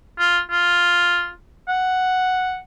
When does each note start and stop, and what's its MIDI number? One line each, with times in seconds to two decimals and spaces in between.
0.19 0.39 65
0.51 1.30 65
1.68 2.58 78